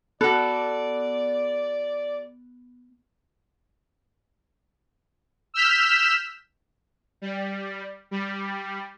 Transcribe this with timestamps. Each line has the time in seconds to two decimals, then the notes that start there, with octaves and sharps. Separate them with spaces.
0.21 B3 F#4 A4 D5
5.54 E6 F6 G6 B6 E7
7.22 G3
8.11 G3